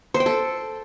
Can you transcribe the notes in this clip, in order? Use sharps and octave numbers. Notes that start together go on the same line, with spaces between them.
C5
G5
A4